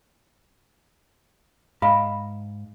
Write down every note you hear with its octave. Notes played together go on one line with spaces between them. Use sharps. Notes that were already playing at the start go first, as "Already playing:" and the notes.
G#2 D#5 F5 B5